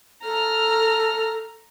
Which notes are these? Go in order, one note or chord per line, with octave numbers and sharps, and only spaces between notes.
A4 A#5 F6